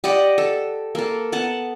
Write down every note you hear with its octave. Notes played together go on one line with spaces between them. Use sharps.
G4 D5 D#5 F#5
A4
A#3 A4
B3 F#5 A5